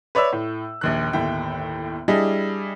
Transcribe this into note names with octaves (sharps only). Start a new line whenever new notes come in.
B4 C#5 D5 E5 E6
A2
A#1 D#2 F#6
G1 D#2 A2 E4 G5
G3 D4 E4 G#4 D#5